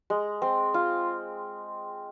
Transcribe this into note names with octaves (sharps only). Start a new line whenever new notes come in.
G#3
C4
F4